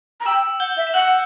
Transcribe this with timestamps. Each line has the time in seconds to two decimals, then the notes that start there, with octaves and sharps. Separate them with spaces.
0.21 A#5
0.26 G5 E6 E7
0.43 G5
0.60 F#5 G6 G7
0.77 E5
0.87 E7
0.94 F#5 F#6 F#7